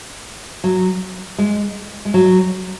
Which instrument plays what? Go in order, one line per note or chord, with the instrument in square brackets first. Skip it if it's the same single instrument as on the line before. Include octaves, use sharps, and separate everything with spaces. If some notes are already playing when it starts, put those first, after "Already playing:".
[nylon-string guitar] F#3
G#3
G#3
F#3